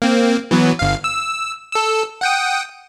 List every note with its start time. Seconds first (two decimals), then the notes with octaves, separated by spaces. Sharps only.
0.02 A#3 C4
0.51 E3 F#3 B3
0.79 G1 F5
1.04 E6
1.72 A4 E6
2.21 F#5 G5 D#6